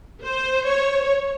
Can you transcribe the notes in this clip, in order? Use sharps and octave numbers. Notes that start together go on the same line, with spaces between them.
C5
C#5